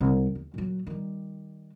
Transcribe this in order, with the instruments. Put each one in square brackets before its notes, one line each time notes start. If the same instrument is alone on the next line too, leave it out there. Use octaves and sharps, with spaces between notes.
[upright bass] C2 G#3
D#2
A#2 F#3
D#3 G3